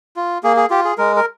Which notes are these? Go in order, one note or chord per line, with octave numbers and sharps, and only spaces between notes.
F4
A#3 G#4
G#4
F4 G4
G#4
G#3 A#4
A#4